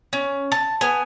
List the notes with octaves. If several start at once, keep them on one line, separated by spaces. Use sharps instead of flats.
C#4
A5
B3 G#5